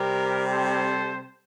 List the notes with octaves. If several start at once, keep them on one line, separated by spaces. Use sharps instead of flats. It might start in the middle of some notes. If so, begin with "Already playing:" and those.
Already playing: C3 G3 C4 G4 A#4
A4 C5